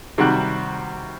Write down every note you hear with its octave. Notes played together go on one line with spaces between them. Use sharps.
C3 D#3 G3 F#4 G5 F#6